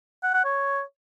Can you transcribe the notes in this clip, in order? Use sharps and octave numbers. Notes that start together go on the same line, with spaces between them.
F#5
F#5
C#5